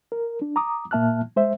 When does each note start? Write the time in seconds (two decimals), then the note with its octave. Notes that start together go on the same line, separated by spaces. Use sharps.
0.12 A#4
0.42 D4
0.56 A#5 D6 D#6
0.91 A#2 A#3 E5 A5 F6 F#6
1.36 G#3 C5 E5